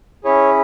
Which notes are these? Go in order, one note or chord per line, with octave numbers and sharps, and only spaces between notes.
C#4 E4 G#4 C#5